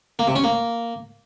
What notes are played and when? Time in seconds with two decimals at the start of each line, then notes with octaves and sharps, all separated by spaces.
0.19 A#3
0.27 C3
0.36 C#4
0.44 A#3